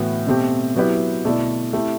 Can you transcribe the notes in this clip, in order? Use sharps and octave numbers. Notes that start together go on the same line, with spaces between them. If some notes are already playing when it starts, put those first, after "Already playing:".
Already playing: A2 E3 B3 F#4
B2 A3 C4 G4
F#3 B3 E4 G4 B4
B2 A3 E4 A4 D5
A3 C4 E4 G4